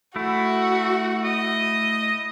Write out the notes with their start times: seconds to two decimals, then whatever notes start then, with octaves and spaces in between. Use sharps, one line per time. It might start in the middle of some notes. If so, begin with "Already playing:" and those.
0.16 A3 E4 F#4
1.24 D#5